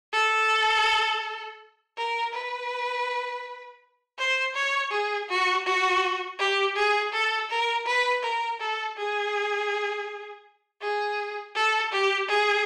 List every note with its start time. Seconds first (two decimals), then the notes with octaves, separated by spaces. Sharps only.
0.13 A4
1.98 A#4
2.33 B4
4.19 C5
4.55 C#5
4.91 G#4
5.29 F#4
5.66 F#4
6.39 G4
6.76 G#4
7.13 A4
7.50 A#4
7.86 B4
8.23 A#4
8.60 A4
8.97 G#4
10.82 G#4
11.55 A4
11.92 G4
12.29 G#4